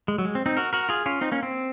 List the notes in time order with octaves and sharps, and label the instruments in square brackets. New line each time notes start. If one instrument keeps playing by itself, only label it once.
[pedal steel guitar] G#3
F#3
G#3
C4
C4 D#4
F#4 A#4
F#4 A#4
F4 G#4
C#4 F4
C4 D#4
A#3 C#4
C4